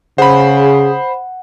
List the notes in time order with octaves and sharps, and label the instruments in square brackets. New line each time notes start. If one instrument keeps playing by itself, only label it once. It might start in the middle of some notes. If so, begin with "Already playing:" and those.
[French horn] C#3 [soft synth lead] G#4 [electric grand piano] C5 B5 [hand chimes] F#5